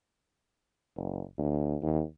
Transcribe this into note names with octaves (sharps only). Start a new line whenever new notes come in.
F#1
D2
D#2